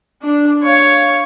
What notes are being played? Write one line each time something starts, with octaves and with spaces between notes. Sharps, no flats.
D4
C#5 F5